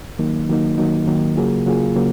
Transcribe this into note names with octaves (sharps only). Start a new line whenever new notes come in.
D#3 F#3 A#3 D#4
D#3 F#3 A#3 D#4
D#3 F#3 A#3 D#4
D#3 F#3 A#3 D#4
C#3 F#3 A#3 F4 G#4
C#3 F#3 A#3 F4 G#4
C#3 F#3 A#3